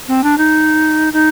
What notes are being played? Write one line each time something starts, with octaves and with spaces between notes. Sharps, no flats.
C4
D4
D#4
D#4